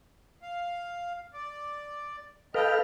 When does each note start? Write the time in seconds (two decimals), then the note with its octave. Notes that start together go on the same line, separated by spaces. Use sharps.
0.42 F5
1.33 D5
2.54 A4 B4 D#5 F5 G5